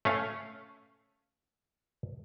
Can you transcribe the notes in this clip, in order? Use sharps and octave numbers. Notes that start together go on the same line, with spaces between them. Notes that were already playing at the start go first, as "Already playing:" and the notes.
A3 C#4 F5